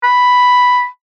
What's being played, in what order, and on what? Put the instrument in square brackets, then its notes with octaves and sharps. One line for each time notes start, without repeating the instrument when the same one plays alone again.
[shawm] B5